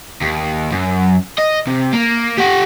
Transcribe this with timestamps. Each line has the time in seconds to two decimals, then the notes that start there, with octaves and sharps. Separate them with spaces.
0.22 D#2
0.72 F#2
1.38 D#5
1.67 C3
1.93 A#3
2.38 G4 F#5